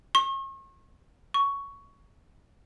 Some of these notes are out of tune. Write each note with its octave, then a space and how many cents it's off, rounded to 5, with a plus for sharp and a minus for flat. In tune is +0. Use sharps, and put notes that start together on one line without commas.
C#6 -40
C#6 +10